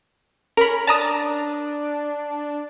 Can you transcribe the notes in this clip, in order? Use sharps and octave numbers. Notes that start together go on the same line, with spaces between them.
C#4 A#4 B5
D4 A5 A#5 D#6